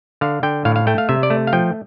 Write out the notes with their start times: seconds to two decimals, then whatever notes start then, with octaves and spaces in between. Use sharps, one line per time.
0.21 D3 F5
0.43 D3 G5
0.65 A2 F5
0.76 F5
0.87 A3 G5
0.98 F5
1.09 C3 E5
1.23 D5
1.30 A3
1.47 F5
1.53 F3 G5